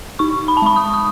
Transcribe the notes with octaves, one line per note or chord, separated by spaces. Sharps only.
D#4 C#6
B5
A5
G#3 B5
D#6
D#6